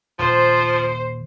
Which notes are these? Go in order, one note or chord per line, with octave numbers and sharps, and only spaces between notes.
D#1 F3 C5